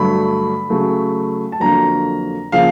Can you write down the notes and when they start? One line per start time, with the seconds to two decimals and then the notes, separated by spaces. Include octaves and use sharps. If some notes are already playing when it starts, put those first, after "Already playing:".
Already playing: G2 D3 F#3 A3 B5
0.70 C#3 F#3 A3
1.52 A5
1.60 F2 D3 F#3 A#3 A#5
2.52 C#3 F3 A#3 F5